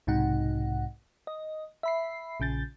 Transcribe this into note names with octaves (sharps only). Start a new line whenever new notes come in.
B1 G#2 C3 D#4 F#5
D#5
E5 B5 C7
A#1 C#3 G6 A6